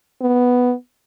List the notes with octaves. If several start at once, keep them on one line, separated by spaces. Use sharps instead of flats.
B3